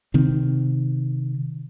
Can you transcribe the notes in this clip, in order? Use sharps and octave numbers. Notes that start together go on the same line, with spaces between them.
C3 D#3 C4